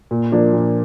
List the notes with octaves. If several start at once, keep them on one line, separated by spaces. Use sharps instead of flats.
A#2
F3 A#3 D4
A#2